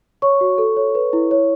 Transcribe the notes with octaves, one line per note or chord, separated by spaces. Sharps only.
C#5 C#6
F#4
A4
C#5
B4
E4
C#5